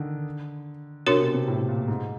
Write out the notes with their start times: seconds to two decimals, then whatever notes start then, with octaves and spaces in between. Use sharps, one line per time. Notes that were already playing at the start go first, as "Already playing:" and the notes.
Already playing: D3 D#3
1.07 C3 D4 F#4 A#4 C#5
1.20 B2
1.34 C3
1.48 A2
1.68 A#2
1.88 G#2